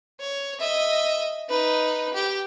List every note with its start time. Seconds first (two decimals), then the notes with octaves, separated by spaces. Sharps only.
0.20 C#5
0.59 D#5 E5
1.49 D#4 B4
2.14 G4